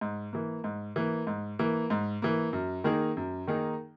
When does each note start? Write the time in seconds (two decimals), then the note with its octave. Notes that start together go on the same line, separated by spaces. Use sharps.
0.01 G#2
0.33 E3 A#3
0.64 G#2
0.96 E3 A#3
1.27 G#2
1.59 E3 A#3
1.90 G#2
2.22 E3 A#3
2.53 F#2
2.84 D#3 A#3 D#4 G#4
3.17 F#2
3.47 D#3 A#3 D#4 G#4